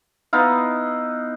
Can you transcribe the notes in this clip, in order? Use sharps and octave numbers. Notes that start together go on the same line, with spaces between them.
B3 D#4 E4 F5